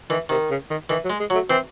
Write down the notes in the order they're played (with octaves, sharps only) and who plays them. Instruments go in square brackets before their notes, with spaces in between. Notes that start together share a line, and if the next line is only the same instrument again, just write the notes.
[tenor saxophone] D#3 [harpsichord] E3
[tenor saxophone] C3 [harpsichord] D#3
[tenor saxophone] C#3
D#3
[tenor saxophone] D#3 [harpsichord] E3
[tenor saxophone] F#3
[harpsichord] G#3
[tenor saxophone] G#3
[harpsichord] F#3
[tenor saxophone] A3
[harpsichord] E3 [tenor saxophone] C4